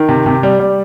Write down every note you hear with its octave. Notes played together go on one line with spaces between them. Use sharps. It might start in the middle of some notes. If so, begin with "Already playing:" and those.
Already playing: D#3
C3
C3
G3
G3